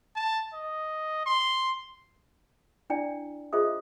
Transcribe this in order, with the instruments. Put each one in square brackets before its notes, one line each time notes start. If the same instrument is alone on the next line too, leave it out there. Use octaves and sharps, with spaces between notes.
[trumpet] A5
D#5
C6
[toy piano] D4 E4 D5 G5
F4 G#4 C5 D#5 E5 D#6